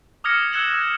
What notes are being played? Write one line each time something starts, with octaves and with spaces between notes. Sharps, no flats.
D6 D#6 F6 G#6 A#6 C#7
E6 F#6 G#6 C#7 E7 F#7